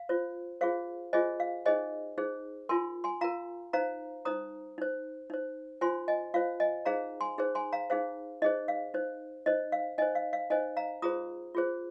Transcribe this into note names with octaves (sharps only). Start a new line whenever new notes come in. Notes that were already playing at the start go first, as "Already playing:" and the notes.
Already playing: F5
F4 C5
F4 G#4 C5 F5
F4 G#4 C5 D#5 G#5
F5
D#4 G#4 C5 D#5 G#5
D#4 G#4 C5
F4 A#4 G#5 C6
G#5 C6
F4 A#4 F5 A#5
D#4 C5 F5 A#5
D#4 C5 A#5 D#6
D#4 C5
D#4 C5
F4 C5 G#5 C6
D#5 G#5
F4 C5 F5
D#5 G#5
D#4 G#4 C5 F5 A#5
G#5 C6
D#4 G#4 C5
G#5 C6
F5 A#5
D#4 G#4 C5 F5
D#4 G#4 C5 D#5
F5
D#4 C5
D#4 C5 D#5
F5
D#4 C5 D#5 G#5
F5
F5
D#4 C5 D#5 G#5
F5 A#5
F4 G#4 C5 A#5 D#6
F4 G#4 C5